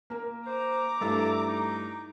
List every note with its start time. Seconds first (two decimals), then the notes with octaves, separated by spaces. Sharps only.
0.10 A#3 A#4
0.46 C5 A#5 D6
1.01 G2 A3 E4 A4
1.48 D#4